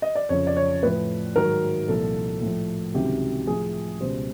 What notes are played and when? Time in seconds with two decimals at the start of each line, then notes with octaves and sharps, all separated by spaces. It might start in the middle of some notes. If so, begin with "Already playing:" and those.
0.02 D#5
0.15 D5
0.29 F2 C#3 F3 C#5
0.47 D5
0.56 C#5
0.83 A2 F3 B4
1.36 G#2 D#3 F#3 A#4
1.88 C2 A#2 F3 A4
2.42 A2 F3
2.94 C#2 C3 D#3 F#3 G4
3.47 A2 F3 G#4
4.00 C#2 B2 G3 C5